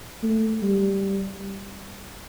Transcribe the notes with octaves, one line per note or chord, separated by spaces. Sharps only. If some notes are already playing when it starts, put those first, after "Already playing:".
A3
G3